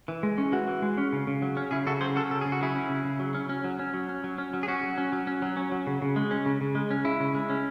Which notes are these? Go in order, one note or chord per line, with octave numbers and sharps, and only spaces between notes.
E3
G#3
C#4
E3 F#4
E3
G#3
C#4
C#3
C#3
F#3
C#4
C#3 E4 G#4
C#3 F#4 A4
F#3 G#4 C5
C#4 F#4 A4
C#3 A4
C#3 G#4
F#4
F#3 E4 G#4
C#4
C#3
C#3
F#3
C#4
C#4
F#3
C#4
F#3
C#4
F#3
C#4
F#3
G#4
C#4 F#4
F#3
C#4
F#3
C#4
F#3
C#4
F#3
C#3
C#3
G#3
C#4
C#3
C#3
G#3
C#4
C#3 E4
C#3
G#3
C#4